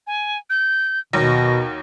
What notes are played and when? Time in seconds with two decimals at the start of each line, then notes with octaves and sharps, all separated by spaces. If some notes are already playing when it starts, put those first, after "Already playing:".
0.07 G#5
0.50 G6
1.13 D#2 B2 F#3 A#6